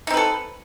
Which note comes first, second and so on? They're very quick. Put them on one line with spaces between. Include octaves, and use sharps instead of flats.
D#4 C4 B4 A4